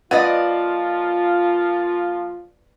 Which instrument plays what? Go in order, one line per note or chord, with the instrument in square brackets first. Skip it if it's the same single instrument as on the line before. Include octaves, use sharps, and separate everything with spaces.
[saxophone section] F3 A#3 F4 [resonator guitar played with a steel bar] B4 D5 D#5 [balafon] F#5